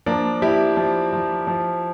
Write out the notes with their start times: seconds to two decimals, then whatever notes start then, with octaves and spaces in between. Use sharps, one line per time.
0.06 F3 A#3 D4
0.42 F3 E4 G4
0.77 F3
1.13 F3
1.47 F3